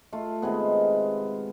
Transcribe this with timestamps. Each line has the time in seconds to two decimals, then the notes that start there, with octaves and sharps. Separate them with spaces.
0.13 A3 F4
0.42 C3 D#3 G#3 B3